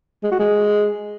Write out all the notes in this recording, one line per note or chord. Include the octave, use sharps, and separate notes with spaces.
G#3
F#4
G#3